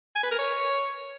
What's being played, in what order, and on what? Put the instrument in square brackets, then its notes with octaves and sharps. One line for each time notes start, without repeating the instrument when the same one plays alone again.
[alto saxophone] G#5
B4
A#4
C#5